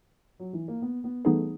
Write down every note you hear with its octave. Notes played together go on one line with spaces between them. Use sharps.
F#3
E3
A#3
B3
B3
E3 G3 A3 B3 D#4 G#4